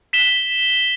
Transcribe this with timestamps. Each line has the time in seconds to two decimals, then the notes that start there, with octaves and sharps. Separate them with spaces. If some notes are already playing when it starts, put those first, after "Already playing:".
0.13 B6 E7 G7